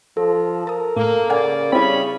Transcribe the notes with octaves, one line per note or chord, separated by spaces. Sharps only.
F3 A4
A#4 A5 D#6
A2 A#3
C#3 A#3 D5 F5 F#5 G#5
C#3 G3 C4 C#4 E4 B5